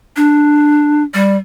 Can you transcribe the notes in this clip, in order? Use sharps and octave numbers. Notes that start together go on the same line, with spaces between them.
D4
G3